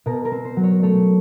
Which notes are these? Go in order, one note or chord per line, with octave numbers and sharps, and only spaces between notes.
B2 A#4
A#4
C4
C5
F#3
C#5
A3 C#5